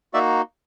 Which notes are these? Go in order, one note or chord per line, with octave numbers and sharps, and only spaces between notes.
A#3 D#4 F#4 D5 E5